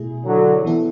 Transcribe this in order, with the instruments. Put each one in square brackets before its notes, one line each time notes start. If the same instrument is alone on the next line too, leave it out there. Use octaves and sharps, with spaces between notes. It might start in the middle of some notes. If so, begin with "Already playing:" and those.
Already playing: [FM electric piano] B2 A3 E4 G#4
[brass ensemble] D3 F#3
[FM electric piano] E3 B3 E4 A4